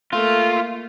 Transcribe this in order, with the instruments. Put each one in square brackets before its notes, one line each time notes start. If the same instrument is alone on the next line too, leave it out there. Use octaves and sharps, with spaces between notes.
[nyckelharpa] A3 A#3 [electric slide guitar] F4